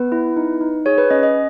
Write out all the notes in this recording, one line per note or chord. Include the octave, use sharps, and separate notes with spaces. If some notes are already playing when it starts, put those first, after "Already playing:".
Already playing: B3 B4
E4
D#4
D#4
G#4 C#5
B4
C#4 D#5
D#5